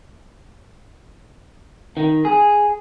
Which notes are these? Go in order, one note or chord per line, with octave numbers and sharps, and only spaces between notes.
D#3
G#4